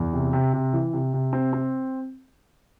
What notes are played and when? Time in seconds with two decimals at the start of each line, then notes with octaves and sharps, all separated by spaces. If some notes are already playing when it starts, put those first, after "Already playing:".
Already playing: E2
0.13 C3
0.33 C3
0.53 C3
0.73 E3
0.93 C3
1.14 C3
1.33 C4
1.53 C4